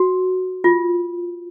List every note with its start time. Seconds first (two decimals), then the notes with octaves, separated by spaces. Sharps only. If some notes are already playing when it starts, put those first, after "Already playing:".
Already playing: F#4
0.64 F4